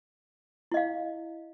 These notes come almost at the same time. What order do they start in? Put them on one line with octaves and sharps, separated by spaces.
E4 D#5 F5